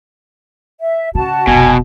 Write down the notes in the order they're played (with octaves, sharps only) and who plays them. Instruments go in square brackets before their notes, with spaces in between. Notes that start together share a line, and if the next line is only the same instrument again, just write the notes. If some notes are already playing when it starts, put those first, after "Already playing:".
[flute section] E5
[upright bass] C#3 [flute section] F#4 A5
[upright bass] F1 B1 [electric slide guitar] B2 [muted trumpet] G#5